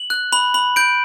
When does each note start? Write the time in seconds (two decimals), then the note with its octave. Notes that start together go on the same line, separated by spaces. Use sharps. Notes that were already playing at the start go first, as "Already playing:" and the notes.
Already playing: F#7
0.10 F#6
0.33 B5 F#7
0.54 B5 F#7
0.76 G6 D7